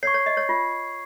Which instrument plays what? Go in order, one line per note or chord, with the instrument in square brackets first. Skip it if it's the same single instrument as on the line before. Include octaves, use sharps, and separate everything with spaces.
[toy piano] C#5 [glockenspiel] C7
[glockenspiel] C#6 G#6
[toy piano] C#5
D#5
C#5
F4